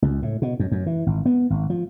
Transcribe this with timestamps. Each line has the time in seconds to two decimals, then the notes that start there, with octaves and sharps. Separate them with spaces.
0.02 C#2
0.22 A2
0.42 B2
0.60 F#2
0.72 F#2
0.86 E3
1.06 G#1
1.26 B3
1.50 G#1
1.70 F3